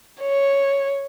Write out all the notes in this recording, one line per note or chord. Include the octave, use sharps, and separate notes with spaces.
C#5